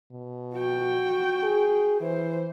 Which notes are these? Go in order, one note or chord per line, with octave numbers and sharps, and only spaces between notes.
B2
F#4 G5
G#4
E3 C5